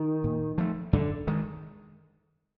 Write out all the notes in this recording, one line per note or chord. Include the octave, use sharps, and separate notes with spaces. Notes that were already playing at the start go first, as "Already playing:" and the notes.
Already playing: D#3
A#2
F3 A3
F#2 D3
D#3 G#3